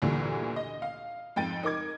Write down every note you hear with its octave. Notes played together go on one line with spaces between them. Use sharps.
G1 D2 G2 A#2 D3 E3
D#5
F5
F2 G#2 G5 A6 D7 D#7
D#4 A#4 D6 G#6